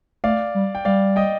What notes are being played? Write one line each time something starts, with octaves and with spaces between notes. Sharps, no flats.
A3 D5 F5
G3
G5
G3 D5 F5
D#5 G5